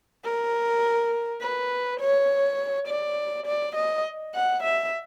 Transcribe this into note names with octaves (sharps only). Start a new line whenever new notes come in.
A#4
B4
C#5
D5
D5
D#5
F#5
E5